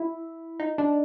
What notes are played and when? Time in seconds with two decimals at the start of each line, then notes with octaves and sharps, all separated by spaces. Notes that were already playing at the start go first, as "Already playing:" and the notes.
Already playing: E4
0.60 D#4
0.78 D4